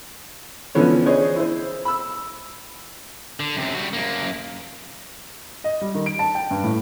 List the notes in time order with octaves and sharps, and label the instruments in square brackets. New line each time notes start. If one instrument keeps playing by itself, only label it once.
[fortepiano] D3 E3 F3 B3 C#4
D4 G#4 C5 C#5 D#5
E4 C5
B5 E6
[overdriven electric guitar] D3
F#2 C3
G3 F#4
F#2 A#3
[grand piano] D#5
G3
D#3
D7
A5
G5
G2
A2